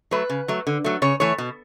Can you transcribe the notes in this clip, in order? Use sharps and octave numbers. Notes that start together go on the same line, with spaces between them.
F#3 A3 B4
C#3
F#3 A3
D3
F#3 A3
C#3 C#5
E3 A3 C#5
B2